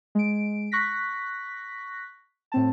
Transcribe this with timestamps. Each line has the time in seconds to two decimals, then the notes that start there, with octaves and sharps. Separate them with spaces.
0.15 G#3 D7
0.72 C#6 F#6 A#6 B6
2.52 A2 C4 A5